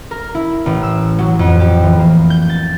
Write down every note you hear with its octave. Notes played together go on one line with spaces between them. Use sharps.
A#4
E4
A1
E6
F#3
F2
G4
E3
A#3
G6
A6